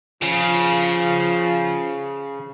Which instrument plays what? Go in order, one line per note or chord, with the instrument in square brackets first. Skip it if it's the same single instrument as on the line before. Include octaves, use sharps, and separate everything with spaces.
[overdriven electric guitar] C#3 [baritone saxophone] F3